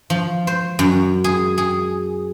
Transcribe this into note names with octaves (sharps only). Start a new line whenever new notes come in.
F3
C5
F#2
G#4
G#4